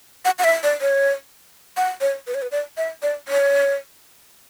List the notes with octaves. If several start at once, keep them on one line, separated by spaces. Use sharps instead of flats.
F#5
F#5
E5
D5
C#5
F#5
C#5
B4
C#5
B4
D5
E5
D5
C#5